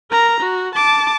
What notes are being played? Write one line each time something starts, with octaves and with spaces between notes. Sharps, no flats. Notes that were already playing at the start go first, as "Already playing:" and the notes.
A#4 A#5
F#4
A5 D6